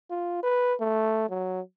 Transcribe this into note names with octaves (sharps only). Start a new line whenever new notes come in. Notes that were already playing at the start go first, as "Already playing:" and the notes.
F4
B4
A3
F#3